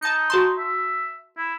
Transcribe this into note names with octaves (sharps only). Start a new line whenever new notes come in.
D#4 A5 C#7
F#4 A5 C6
E5
E4